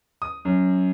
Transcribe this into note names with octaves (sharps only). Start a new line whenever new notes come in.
D#6
F#2